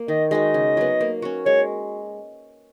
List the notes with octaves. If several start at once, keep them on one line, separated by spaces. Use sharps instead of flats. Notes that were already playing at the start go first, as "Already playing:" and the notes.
Already playing: A#3
D#3 D#5
G#3 D#4 F#4 D#5
C#3
F#3 B3
A#3
C#4 F#4
G#3 C#5